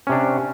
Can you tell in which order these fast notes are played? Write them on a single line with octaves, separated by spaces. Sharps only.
C#4 C3 D4